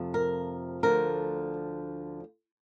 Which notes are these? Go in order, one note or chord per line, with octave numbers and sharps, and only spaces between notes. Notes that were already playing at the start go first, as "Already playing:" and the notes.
Already playing: F2 C3 F3 A3
A#4
D2 D3 F3 A#4